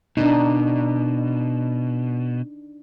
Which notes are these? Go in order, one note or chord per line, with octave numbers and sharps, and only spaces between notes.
B2 D4 D#4